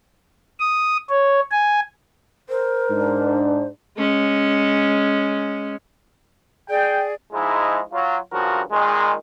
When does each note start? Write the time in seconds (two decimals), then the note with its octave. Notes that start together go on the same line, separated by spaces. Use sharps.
0.60 D#6
1.10 C#5
1.51 G#5
2.49 A#4 C5
2.90 G#2 D4
3.98 G#3 C#4
6.70 G#4 D5 G5
7.33 G#2 F3 G#3 D#4 E4
7.92 F#3 F4
8.32 G2 C#3 F3 F#4 A#4
8.71 A#2 D#3 G#3